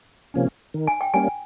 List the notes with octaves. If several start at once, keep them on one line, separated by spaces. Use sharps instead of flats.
C3 F3 A#3 C#4
D#3
G#5
G5
G3 A#3 C#4 G#5